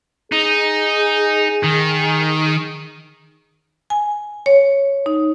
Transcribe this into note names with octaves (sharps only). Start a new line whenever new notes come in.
D#4 G#4
D#3
G#5
C#5
D#4